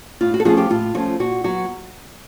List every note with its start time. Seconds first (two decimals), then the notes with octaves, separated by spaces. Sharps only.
0.21 A2 F4
0.34 F#4
0.40 A4
0.45 F3 A3 C#4 F4 F#4 G#4
0.57 F4 G4
0.70 A2 F4
0.94 F3 A3 C#4 F4 F#4
1.20 A#2 F#4
1.44 F#3 B3 F#4